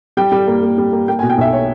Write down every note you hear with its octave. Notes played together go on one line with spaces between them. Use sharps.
G3 G5
G3
A#3
A#3
G3
A#3
A#3 G5
G#5
B2
G5
B1 E5
C#5